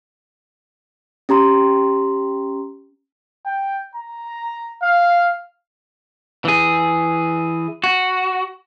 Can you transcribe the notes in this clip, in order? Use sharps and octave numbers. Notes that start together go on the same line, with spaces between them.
C#4 G4 A#5 C6
G5
A#5
F5
E3 G#4
F#4